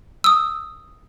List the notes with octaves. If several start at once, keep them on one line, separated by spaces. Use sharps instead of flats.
D#6 E6